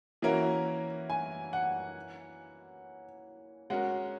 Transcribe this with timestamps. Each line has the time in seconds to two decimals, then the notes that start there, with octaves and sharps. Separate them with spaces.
0.22 E3 A#3 C#4 F#4 A#4 E5
1.10 G#5
1.53 F#5
3.70 G#3 C#4 F#4 A#4 F#5